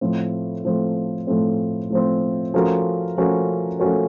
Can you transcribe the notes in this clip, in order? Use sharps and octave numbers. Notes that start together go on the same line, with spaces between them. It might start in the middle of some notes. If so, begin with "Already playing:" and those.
A2 F3 A3 C4
A2 F3 A3 C4
A2 F3 A3 C4
A2 F3 A3 C4
F3 A3 C#4 F#4 A#4
F3 A3 C#4 F#4 A#4
F3 A3 C#4 F#4 A#4